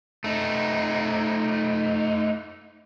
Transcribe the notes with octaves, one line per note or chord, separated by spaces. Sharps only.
A3 D#4